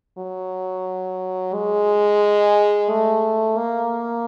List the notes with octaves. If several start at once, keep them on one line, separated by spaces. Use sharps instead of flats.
F#3
G#3
A3
A#3